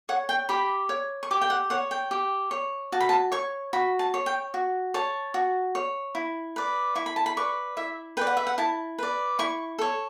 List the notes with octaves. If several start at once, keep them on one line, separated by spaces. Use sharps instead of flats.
C#5 F#5
G5
G4 B5
C#5
C#6
G4 D6
G5
F#5
C#5 F#5
G5
G4
C#5
F#4 A5
B5
A5
C#5 C#6
F#4 B5
A5
C#5
G5
F#4
C#5 A5
F#4
C#5
E4
B4 D5
E4 C#6
B5
A5
B5
B4 D5 C#6
E4 E5
B4 D5 G5
F#5
E5
F#5
E4 A5
B4 D5
E4 C#6
A4 C#5